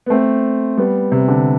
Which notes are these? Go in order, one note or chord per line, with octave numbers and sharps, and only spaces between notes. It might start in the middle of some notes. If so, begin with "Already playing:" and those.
B3
A3 C4
G3 B3
C3
D3